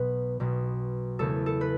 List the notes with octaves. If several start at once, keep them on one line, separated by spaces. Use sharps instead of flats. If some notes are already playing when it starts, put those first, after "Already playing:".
Already playing: B1 B2 B3 B4
B1 B2 B3
E2 C#3 A3 E4 A4
A4
B4